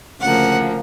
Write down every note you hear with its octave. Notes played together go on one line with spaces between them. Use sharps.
D2 C#3 F3 A#3 F#5